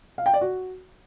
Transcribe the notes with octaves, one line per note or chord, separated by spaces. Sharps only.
F5
G5
D5
F#4